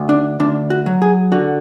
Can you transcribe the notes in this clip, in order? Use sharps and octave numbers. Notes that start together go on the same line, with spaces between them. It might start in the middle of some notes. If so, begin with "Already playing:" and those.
Already playing: D2
D4
D2 D4
F#4
F#3
G#4
D3 F#4